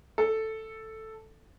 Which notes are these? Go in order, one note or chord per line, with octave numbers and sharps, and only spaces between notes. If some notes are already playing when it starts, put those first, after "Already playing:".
A4